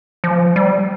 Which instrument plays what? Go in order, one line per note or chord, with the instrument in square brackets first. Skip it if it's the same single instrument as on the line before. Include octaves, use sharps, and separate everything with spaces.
[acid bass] F3
G3